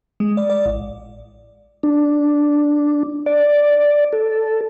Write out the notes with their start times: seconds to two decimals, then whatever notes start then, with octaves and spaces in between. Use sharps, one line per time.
0.20 G#3
0.37 D5
0.50 D5
0.66 A1
1.83 D4
3.26 D5
4.13 A4